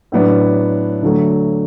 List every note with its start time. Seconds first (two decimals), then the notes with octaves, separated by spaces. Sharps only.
0.12 A2 F#3 B3 D4
1.02 D2 D3 F#3 A3